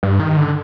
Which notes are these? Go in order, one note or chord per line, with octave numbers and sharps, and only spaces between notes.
G2
D#3
D3